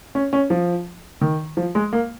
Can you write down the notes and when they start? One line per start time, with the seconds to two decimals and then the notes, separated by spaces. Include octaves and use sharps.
0.15 C#4
0.33 C#4
0.50 F3
1.21 D#3
1.57 F3
1.75 G#3
1.93 A#3